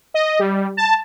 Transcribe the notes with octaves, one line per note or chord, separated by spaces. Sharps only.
D#5
G3
A5